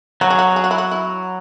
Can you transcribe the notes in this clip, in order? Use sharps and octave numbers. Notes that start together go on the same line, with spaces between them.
F#3 F#4
G#4
F#4
G#4
F#4
E4
F#4
E4